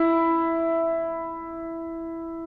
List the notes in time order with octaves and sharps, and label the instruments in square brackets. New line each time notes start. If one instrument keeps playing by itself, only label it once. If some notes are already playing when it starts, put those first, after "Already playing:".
Already playing: [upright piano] E4